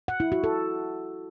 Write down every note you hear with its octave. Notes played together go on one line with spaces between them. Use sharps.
F#5
E4
F#4
A4